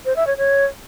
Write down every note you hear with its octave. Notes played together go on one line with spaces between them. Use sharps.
C5
E5
C#5
C#5